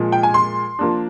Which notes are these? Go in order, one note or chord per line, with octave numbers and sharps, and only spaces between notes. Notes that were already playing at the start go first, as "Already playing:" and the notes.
Already playing: A#2 F3 G#3
G5
G#5
C6
F3 A#3 D4